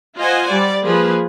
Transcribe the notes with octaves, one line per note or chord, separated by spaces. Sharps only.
F4 C5 D#5 F#5 G#5
G3 D5
F3 A#3 G#4 B4